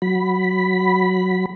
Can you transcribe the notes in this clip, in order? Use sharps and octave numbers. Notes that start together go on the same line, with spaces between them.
F#3 B5